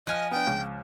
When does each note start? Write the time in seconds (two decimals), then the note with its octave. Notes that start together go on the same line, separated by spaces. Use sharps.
0.07 F3 D#5 G#5 F6 F#6
0.31 B3 D4 G5
0.47 C#2